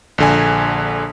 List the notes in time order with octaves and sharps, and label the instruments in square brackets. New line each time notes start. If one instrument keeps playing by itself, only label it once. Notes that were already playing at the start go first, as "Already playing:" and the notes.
[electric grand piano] A#1 D3 G#5